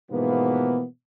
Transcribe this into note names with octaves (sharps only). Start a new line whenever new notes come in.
G#2 B2 E3 F3 A#3 B3